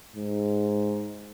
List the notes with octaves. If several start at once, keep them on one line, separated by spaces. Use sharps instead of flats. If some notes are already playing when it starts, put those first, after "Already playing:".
G#2